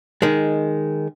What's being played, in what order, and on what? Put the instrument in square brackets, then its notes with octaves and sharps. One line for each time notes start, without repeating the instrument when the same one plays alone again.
[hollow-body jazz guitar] D#3 G#3